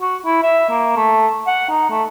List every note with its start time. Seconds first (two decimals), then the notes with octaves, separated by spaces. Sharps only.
0.01 F#4
0.26 E4
0.43 E5
0.70 A#3
0.96 A3
1.47 F#5
1.69 D#4
1.90 A3